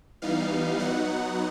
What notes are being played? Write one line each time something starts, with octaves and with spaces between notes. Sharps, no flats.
E3 G3 B3 D#4 F5
F#3 B3 D#4 F#5